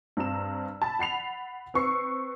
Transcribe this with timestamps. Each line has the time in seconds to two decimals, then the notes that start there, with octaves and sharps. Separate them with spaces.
0.17 G2 C4 A#5 E6 E7
0.82 A5 B5 A6
0.99 F#5 B5 C7 F7
1.74 C4 B4 C#6 E6 C7